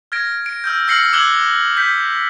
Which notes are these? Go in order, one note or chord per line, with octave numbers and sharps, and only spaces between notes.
F6 G#6 A#6 D7
D7
E6 F6 G6
E6 F6 A#6 C7 C#7 F#7
D6 E6 F#6 G#6 F#7 G7
G6 B6